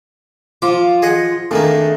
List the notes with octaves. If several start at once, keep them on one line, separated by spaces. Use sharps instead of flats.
F3 F4 D6
G#4 D#5 F#5
F2 D#3 A3 A#3 D4 G#4